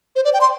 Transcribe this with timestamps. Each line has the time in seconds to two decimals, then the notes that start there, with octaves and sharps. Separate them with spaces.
0.16 C5
0.25 D5
0.34 G5
0.41 C6